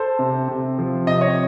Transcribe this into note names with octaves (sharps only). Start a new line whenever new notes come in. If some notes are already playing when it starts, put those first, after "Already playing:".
Already playing: A4 C5
C3
C3
F3
C3 D#5
C#5